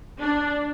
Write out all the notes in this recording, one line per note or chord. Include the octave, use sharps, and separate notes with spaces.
D4